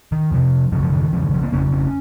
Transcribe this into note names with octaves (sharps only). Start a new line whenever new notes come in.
D#3
F2 C3 F3
F#2 C#3 F3
F3
D#3
F2 C#3 F3
D#3
F3
A#3
F2 C#3 C#4
C#4